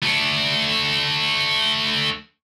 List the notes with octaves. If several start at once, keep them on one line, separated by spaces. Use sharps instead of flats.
A3 D4